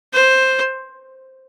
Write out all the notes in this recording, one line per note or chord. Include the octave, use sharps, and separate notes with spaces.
C5